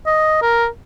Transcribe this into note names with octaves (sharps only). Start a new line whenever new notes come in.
D#5
A#4